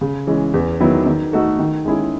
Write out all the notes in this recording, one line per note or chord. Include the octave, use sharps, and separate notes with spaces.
C#3
E3 G#3 C#4
E2
D#3 F#3 B3 E4
D#3
A3 D#4 F#4 A4
D#3
G#3 C#4 E4 G#4